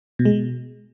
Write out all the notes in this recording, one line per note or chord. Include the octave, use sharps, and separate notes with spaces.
B2
G#3
B2